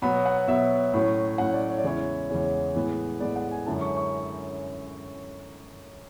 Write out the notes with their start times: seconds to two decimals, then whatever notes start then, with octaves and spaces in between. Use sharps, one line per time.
0.02 B2 F#3 B3 B5
0.26 F#5
0.48 B2 F#3 B3 E5
0.94 A2 F#3 C#4
1.38 A2 F#3 C#4 F#5
1.54 D5
1.69 C#5
1.78 D5
1.84 E2 C#3 G#3 C#4 E4 C#5
2.29 E2 C#3 G#3 C#4 E4 C#5
2.75 A2 E3 G#3 B3
3.20 A2 E3 G#3 B3 D5
3.36 F#5
3.51 G#5
3.66 F#2 D3 G#3 C#4 E4 A5
3.81 C#6
3.97 C#6